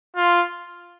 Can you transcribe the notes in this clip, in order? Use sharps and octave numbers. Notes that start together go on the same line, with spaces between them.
F4